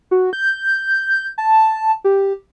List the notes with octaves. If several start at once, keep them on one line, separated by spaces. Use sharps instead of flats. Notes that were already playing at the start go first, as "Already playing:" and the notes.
F#4
G6
A5
G4